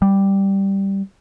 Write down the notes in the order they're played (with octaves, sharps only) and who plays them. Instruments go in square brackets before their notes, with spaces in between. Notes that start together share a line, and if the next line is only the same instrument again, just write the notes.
[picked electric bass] G3